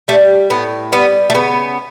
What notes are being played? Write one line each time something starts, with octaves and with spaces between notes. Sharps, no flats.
G3 A3
A2 B3
G3 B3
A3
C#3 B3